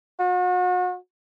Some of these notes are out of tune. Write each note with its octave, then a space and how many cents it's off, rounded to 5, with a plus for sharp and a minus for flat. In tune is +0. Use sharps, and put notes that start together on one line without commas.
F#4 -40